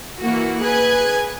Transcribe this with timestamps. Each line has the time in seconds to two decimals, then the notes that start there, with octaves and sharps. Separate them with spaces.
0.21 E3 A#3 F#4
0.62 G#4 B4 G#5 F#6 G#6